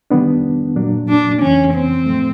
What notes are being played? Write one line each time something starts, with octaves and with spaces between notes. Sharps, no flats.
D#3 G3 B3 D4
A#2 F#3 A#3 D4
D4
F2 C#3 E3 C#4
C4
A2 F3 A3